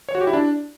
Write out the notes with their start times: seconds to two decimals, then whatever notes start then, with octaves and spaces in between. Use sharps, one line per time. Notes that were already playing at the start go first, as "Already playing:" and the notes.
0.09 C#5
0.15 F#4
0.21 G4
0.27 E4
0.33 D4